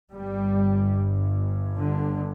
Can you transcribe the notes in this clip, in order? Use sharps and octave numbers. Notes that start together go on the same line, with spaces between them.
G1 G2 G3
D3